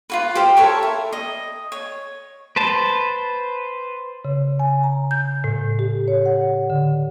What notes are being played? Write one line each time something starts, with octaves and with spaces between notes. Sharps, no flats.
F4 F#4 B4
G4 C5 F5 G5
A4 A#4 C#5 C#6
E4
D#5
C#5
B4 C5 A5
C#3
G#5
A#5
G6
A2
G4
C#5
F#5
D3